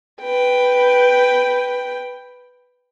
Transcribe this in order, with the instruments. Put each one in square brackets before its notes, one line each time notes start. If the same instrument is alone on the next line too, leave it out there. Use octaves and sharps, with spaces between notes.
[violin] B4 G5